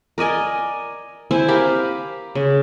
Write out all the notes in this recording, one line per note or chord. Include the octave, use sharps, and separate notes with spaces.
A#4 D5 D#5 G#5
C4 E4 C5 G#5
G4 A#4 F5 B5
C#3